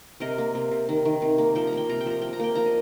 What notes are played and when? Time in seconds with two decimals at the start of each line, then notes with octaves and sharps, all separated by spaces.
0.20 C3 A#4 D#5
0.38 A#3
0.55 C3
0.71 C3
0.89 D#3
1.05 D#3
1.22 C3
1.38 A#3
1.55 F3 G5
1.67 A#5
1.72 A#3 G5
1.89 C3 A#5
2.00 G5
2.06 F3 A#5
2.21 A#3 G5
2.33 A#5
2.40 A#3 G5
2.55 F3 A#5
2.66 D#5